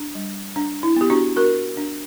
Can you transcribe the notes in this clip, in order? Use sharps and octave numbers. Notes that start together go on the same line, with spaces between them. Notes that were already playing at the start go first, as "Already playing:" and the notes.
Already playing: D4
G3
D4
E4
B3 G4
D4 F#4
D4 F#4 A#4
D4